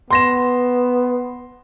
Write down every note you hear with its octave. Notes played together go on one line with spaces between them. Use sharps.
B3 C6 A#6 E7